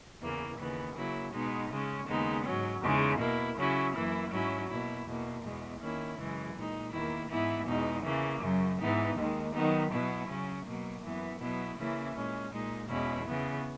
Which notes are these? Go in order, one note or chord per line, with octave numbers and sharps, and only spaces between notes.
E2 C#3 E3 A#3
D#2 C#3 E3 B3
C#3 F#3 A#3 E4
B2 G#3 B3 D#4
C#3 G#3 C#4
D#2 C#3 G#3 B3 D#4
G#2 F#3 C#4
E2 C#3 G#3 D#4
B2 A#3 E4
C#3 F#3 C#4 E4
F#2 E3 A#3 E4
G#2 F#3 C#4 E4
B2 A#3 E4
E2 B2 A#3
E2 B2 G#3
D#3 A#3 C#4 E4
F#2 C#3 E3 G#3
A#2 G#3 D#4
E2 D#3 A#3 E4
G#2 E3 B3 E4
E2 B2 G#3 D#4
C#3 E3 A#3
F#2 C#3 F#3
G#2 E3 B3 D#4
D#2 D#3 G#3
D#3 F#3 B3 D#4
B2 F#3 B3 E4
C#3 F#3 C#4
B2 F#3 A#3
F#2 E3 B3
B2 F#3 B3 E4
C#3 E3 A#3 C#4 E4
A#2 G#3 C#4
A#2 G#3 D#4
E2 B2 G#3 C#4 E4
C#3 E3 B3